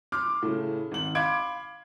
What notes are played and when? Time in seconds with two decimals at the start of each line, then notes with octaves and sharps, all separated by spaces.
0.12 C6 D6 F6
0.42 A2 C#3
0.91 G#1 F#7
1.15 F5 B5 C6 D6 G#6 D7